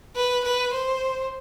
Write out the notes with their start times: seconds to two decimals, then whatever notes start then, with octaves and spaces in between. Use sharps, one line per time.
0.16 B4
0.45 B4
0.73 C5